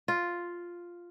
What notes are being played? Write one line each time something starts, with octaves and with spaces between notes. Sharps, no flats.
F4